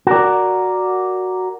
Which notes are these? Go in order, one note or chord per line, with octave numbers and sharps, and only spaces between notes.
F#4 A#4 D5